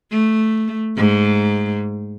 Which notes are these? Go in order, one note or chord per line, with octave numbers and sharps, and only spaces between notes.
A3
G#2